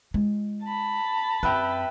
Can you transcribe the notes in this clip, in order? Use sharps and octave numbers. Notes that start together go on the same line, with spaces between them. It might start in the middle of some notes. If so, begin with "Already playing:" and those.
G#3 F4
A5 B5
F#2 C4 B4 E5 G5